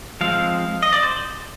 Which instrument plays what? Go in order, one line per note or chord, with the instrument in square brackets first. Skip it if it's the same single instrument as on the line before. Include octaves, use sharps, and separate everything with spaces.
[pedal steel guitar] F3 G#3 C4 F5
D#5
D5
C5